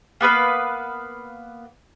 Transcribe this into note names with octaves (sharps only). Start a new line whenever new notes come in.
A#3 B3 B4 F5